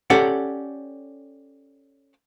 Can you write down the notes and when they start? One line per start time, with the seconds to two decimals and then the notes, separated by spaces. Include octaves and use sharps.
0.10 C#4 G4 A4 D5 F#5